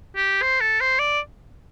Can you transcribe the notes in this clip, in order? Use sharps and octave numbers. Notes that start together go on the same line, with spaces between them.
G4
C5
A4
C5
D5